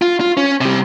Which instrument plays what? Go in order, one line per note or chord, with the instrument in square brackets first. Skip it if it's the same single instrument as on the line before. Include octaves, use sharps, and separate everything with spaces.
[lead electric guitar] F4
F4
C#4
C3 G3